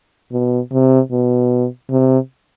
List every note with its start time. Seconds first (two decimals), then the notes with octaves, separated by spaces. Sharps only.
0.32 B2
0.72 C3
1.11 B2
1.91 C3